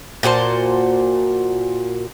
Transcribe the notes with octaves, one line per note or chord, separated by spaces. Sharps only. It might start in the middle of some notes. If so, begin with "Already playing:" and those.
A#2 F#4 C5 A5